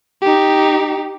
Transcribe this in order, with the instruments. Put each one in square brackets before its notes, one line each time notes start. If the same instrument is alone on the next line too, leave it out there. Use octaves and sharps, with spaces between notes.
[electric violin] D#4 G4